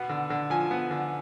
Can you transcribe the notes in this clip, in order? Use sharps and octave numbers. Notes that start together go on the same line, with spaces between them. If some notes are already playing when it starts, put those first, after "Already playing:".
Already playing: B2 B3
D3
D3
F3 G#5
B3
D3